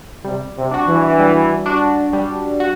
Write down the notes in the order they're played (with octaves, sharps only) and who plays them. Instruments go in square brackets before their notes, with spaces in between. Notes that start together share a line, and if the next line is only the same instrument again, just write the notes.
[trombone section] C3 [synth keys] G3
[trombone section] C3
[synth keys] D4 F#4
[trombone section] E3
[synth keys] G3
D4 F#4
G3
F#4